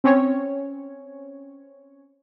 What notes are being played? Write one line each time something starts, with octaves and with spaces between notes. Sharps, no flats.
C4 C#4 C#5